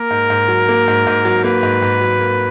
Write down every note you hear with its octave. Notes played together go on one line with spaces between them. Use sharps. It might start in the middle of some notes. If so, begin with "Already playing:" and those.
Already playing: A#3 A#4
G#2
G#2
F#3
A#3
G#2
G#2
F#3
A#3 B4
G#2
G#2
F#3
A#3